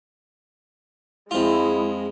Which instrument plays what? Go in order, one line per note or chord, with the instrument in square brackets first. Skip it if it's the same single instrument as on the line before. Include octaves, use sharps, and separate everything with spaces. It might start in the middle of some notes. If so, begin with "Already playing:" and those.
[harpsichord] F2 F4 [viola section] G#3 [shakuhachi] E4